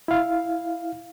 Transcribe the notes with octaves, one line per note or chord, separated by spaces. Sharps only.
E4 F5